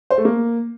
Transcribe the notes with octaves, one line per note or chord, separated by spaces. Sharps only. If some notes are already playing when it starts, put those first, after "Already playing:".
C5
A3
A#3